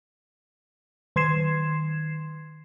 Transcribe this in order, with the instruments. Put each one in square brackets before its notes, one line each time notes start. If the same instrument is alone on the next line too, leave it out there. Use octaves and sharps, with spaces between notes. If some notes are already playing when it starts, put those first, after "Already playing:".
[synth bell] D#3 C6 G#6 C7 E7